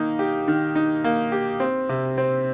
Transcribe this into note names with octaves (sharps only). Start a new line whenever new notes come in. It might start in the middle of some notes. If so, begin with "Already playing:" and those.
Already playing: D#3 A#3 D#4
G4
D#3
D#4
A#3
G4
C4
C3
C4